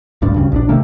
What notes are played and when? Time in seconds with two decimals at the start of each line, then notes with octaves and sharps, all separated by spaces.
0.22 D#1 D2 G2 D4
0.36 D2 G2 C#3
0.52 A#1 F3 D4
0.69 C3 D#3 A3 A#3